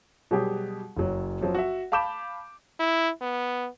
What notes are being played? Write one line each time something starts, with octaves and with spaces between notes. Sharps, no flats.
B2 F#3 G3 G4 G#4
F#1 F#3
F#2 F3 F#3
F#4 E5
F5 A5 B5 D6 G6 E7
E4
B3